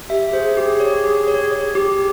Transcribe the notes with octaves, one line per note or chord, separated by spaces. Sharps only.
G4 E5
G#4 C5
G4 G#4
C#5
G4
C#5
C#5
G4